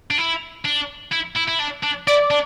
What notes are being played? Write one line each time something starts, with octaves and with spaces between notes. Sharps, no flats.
D4
E4
D4
E4
E4
E4
D4
D4
E4 D5
D4